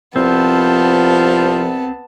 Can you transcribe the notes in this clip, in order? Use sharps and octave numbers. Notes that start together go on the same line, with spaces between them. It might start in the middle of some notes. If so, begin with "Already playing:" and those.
C2 F3 B3 C4 A5